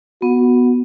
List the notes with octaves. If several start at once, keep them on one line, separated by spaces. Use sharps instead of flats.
B3 F#4